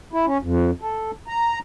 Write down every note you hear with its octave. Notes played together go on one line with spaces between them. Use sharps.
E4
C#4
F2
A4
A#5